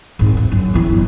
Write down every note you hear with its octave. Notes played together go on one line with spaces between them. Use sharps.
G#1 G#2
E2
F#2
G1 E3
G1